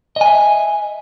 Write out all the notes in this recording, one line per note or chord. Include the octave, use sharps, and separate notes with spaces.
D#5 E5 G#5